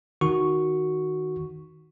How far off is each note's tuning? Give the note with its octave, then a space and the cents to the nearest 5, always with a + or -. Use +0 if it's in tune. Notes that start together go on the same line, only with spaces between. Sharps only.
D#3 +0 F#4 +0 C#6 +0